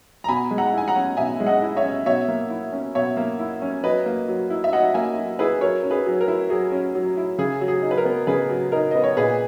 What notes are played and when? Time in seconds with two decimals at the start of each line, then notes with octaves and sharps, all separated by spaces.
0.24 A#5
0.28 B2 G#5 B5
0.51 G#3
0.58 F#5 A#5
0.73 E4 G#5
0.88 F#5 A#5
0.96 C#4
1.17 B2 E5 G#5
1.40 G#3
1.47 D#5 F#5
1.62 E4
1.77 C#5 E5
1.83 C#4
2.06 B2 C#5 E5
2.28 A#3
2.50 E4
2.72 C#4
2.95 B2 C#5 E5
3.17 A#3
3.39 E4
3.62 C#4
3.84 F#3 B4 D#5
4.06 A#3
4.28 F#3
4.50 E4
4.64 E5
4.72 F#3 D#5 F#5
4.94 A#3 E5 G#5
5.18 F#3
5.39 E4 G#4 B4
5.61 F#3 A#4 C#5
5.83 C#4
5.91 G#4 B4
6.06 F#3
6.21 A#4
6.28 E4
6.50 F#3 G#4
6.72 C#4
6.95 F#3
7.17 E4
7.38 C#3 G#4
7.61 F#3
7.68 G#4
7.83 D#4
7.91 B4
7.98 A#4
8.05 B3
8.27 C#3 G#4 B4
8.49 F#3
8.72 D#4 A#4
8.91 B3 D#5
9.04 C#5
9.17 A#2 G#4 B4